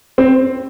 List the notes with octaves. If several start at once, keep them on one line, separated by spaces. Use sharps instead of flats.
C4